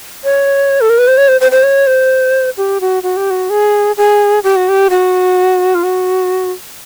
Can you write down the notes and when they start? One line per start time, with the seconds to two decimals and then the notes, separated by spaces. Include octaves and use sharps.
0.24 C#5
0.81 A4
0.90 A#4
0.98 B4
1.08 C5
1.17 C#5
1.28 C5
1.41 C5
1.51 C5
1.63 C#5
1.87 C5
2.57 G4
2.81 F#4
3.03 F#4
3.17 G4
3.31 F#4
3.50 G#4
3.97 G#4
4.44 G4
4.56 F#4
4.69 G4
4.90 F#4
5.75 F4
5.84 F#4